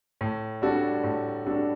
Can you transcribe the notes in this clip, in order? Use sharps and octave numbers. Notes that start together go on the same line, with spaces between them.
A2
G3 D4 F#4 A4
A2
G3 D4 F#4 A4